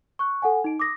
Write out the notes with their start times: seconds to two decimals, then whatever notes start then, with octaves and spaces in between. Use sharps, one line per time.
0.19 C#6 F#6
0.42 A4 F#5 G#5
0.64 D#4 D7
0.80 D6 D#6 A#6